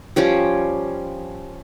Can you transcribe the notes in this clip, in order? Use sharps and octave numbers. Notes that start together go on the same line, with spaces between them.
F3 G3 C#4 G4